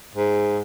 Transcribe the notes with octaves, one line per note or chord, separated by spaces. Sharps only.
G#2